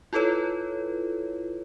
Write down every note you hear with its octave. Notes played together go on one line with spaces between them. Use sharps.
E4 F4 A4 B4 C#5